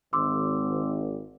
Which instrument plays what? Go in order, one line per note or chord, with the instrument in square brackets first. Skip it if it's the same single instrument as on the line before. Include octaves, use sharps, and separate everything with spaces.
[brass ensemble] G#1 [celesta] C6 D6 E6